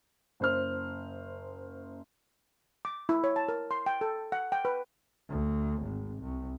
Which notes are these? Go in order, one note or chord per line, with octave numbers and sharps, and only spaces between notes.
F#1 C5 F6
D6
E4
C#5
A5
A#4
C6
G5
A4
F#5
G5
B4
D2
G#1
C2